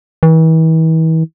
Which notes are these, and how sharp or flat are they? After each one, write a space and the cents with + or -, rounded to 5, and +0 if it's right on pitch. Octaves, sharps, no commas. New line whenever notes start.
E3 -40